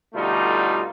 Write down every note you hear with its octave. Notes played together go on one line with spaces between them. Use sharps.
B2 D3 G3 A3 D#4 F4